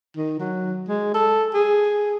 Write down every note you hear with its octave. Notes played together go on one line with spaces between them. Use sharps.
D#3
F#3
G#3
A4
G#4